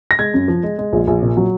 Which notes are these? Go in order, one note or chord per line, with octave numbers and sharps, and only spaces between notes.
A#6
G#3 G#6
F#2
F3
G#3
G#3
A#1
A#1
A#2
F#3